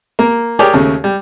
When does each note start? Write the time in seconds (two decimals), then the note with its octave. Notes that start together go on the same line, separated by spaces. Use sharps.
0.19 A#3
0.59 G4 G#4 A#4 C#5 D5
0.74 D#2 C#3 A3
1.04 G3